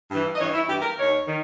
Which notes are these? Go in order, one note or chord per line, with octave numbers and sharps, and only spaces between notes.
G2 E3
D#5
G2 E3 C#5
E4
G2 E3 G4
A#4
D#2 D#3 C#5
D#3